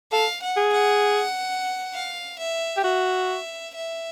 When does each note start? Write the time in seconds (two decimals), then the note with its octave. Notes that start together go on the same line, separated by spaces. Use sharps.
0.12 A4 F5
0.42 F#5
0.57 G#4
0.73 F#5
1.93 F5
2.39 E5
2.77 G4
2.84 F#4 E5
3.75 E5